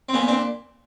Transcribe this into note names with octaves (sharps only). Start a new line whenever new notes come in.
C4
A#2 B3 C#4
C4 D4